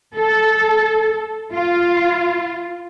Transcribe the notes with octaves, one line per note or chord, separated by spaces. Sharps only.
A4
F4